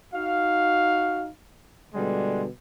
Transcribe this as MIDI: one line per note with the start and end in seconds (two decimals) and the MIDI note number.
0.13 1.25 63
0.13 1.25 66
0.13 1.25 77
1.93 2.44 47
1.93 2.44 50
1.93 2.44 55
1.93 2.44 56